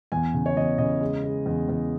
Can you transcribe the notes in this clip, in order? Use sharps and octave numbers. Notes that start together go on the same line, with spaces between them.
E2 G#5
C#3
C#5
E2 D#5
C#3 D#5
G#3
G#3
E2
E2